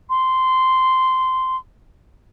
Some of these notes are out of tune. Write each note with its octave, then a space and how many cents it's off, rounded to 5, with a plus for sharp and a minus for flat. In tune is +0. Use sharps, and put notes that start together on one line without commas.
C6 -10